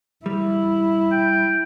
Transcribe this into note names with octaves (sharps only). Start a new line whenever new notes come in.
G3 E4
G5